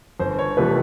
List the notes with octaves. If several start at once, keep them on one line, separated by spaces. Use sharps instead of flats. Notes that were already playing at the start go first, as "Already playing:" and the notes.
G1 C5
C#5
F2 C3 E3 A3 B4